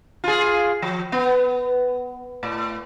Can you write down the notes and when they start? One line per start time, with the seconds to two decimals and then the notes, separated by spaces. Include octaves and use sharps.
0.24 F4 G#4
0.82 F3
1.12 B3
2.43 A2